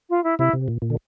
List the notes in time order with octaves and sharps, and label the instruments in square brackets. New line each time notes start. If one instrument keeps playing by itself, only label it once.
[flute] F4
E4
[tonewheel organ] C3 [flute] E4
[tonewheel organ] C3
A#2
A#2
D3